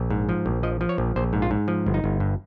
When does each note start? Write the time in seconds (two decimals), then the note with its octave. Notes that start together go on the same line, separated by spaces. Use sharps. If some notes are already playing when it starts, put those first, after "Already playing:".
Already playing: A#1
0.10 G#2
0.29 F3
0.46 A#1
0.63 F3 D#5
0.81 F3
0.89 C#5
0.98 A#1
1.16 A#1 C5
1.33 G#2
1.42 F4
1.51 G#2
1.68 F3
1.86 G1
1.94 D#4
2.04 G1
2.20 G2